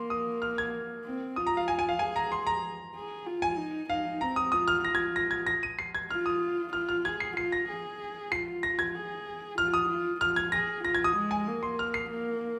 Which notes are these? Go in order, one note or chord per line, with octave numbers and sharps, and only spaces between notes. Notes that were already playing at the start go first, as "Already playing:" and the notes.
Already playing: A#3 C6
D#6
F6
G#6
C4
F4 D#6
A#5
F5
G#5
G#5
F5
G#4 G#5
A#5
C6
A#5
G#4
F4
G#5
D#4
D#4 F5
C4 A#5
D#6
F4 D#6
F6
F4 A#6
G#6
A#6
G#6
A#6
D#7
C7
G#6
F4 F6
D#6
F4 F6
F6
G#4 G#6
C7
F4 C7
A#6
G#4
F4 C7
A#6
G#6
G#4
F4 F6
D#6
F4
F4 F6
G#6
G#4 A#6
F4 A#6
G#6
D#6
G#3
G#5
A#3
C6
F6
C7
A#3